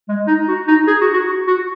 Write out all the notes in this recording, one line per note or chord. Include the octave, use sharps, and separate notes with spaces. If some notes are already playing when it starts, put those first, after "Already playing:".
G#3
D#4
F#4
D#4
G#4
F#4
F#4
F#4
F#4